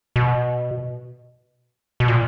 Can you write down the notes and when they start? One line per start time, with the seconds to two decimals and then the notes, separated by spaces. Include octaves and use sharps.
0.16 B2
2.00 B2
2.08 A#2